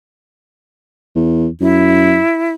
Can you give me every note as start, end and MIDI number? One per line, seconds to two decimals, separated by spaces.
1.15 1.48 40
1.61 2.19 42
1.61 2.53 64